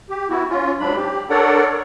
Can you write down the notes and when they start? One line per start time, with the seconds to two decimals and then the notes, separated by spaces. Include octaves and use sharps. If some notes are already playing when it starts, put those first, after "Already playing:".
0.10 G4
0.30 B3 E4 F#4
0.50 C#4 F4
0.80 G#2 F#3 D4 B5
0.96 G4
1.30 D4 A4 A#4 C#5 D5 F#5